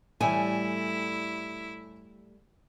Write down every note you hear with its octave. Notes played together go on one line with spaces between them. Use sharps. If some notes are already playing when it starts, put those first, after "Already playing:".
A2 E3 G3 A3 E4 G#5